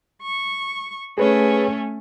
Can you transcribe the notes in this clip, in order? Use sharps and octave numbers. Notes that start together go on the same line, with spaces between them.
C#6
A3 C#4 G#4 B4 C#5